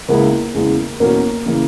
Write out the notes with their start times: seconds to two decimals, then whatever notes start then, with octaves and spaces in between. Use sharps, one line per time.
0.08 C#2 C#3 G#3 A#3 B3 E4
0.54 E2 C#3 E3 G#3
1.00 E2 B2 F#3 A#3 C#4
1.46 C#3 E3 A#3